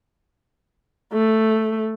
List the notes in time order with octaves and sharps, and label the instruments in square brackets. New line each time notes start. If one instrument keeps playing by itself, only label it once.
[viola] A3